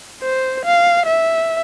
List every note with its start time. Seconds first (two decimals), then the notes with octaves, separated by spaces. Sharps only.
0.22 C5
0.65 F5
1.06 E5